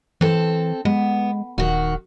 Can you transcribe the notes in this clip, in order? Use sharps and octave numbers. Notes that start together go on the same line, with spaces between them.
E3 C4 A4
G#3 B3
D#1 D#3 F#4